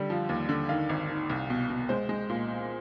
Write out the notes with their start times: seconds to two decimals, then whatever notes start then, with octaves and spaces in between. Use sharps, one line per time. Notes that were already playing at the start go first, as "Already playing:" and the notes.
Already playing: D3 G3
0.10 F3
0.29 D#2
0.49 D3
0.69 D#3 F5
0.89 G#1
1.10 D#3
1.29 C2
1.50 B2
1.70 B2
1.89 G#3 C5
2.09 G#3
2.29 A#2